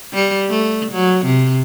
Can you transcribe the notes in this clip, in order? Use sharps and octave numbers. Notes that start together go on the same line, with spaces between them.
G3
A3
F#3
C3